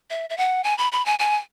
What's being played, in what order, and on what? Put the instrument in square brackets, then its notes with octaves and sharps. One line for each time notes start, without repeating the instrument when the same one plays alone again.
[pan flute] E5
E5
F#5
G#5
B5
B5
G#5
G#5